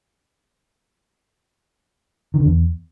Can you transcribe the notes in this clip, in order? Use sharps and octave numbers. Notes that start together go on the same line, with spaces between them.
D#3
D3
E2